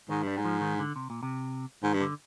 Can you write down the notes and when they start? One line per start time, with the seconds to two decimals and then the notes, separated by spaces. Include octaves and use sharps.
0.09 G#2 D#3
0.23 G2 G3
0.37 G#2
0.45 F3
0.61 D#3
0.80 D3
0.96 C3
1.10 A#2
1.23 C3
1.83 G#2 D#3
1.94 G2
2.01 D3